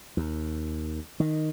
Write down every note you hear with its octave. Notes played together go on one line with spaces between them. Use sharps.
D#2
D#3